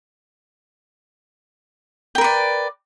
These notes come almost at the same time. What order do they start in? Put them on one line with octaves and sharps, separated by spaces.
G5 A#4 B4 D5